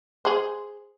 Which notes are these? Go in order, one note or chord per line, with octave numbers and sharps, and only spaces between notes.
G#4 C5